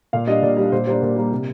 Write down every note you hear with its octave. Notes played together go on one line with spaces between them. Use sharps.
A#2 F5
G3 D4 D#5
A#2 D5
G3
D4
A#2 C5
G3 A#3 D4 C5
A#2 A#4
G3 A#3 D4
C3